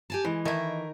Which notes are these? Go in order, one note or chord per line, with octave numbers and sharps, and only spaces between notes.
G4 G#5 A5
E3 G#3
D#3 A3 E4 A#4